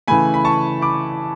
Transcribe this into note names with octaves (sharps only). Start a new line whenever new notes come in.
C#3 E3 A3 G#5 B5
B5
A5 C#6
B5 D6